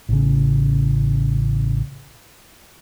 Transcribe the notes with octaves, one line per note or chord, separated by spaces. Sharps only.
A1 C#3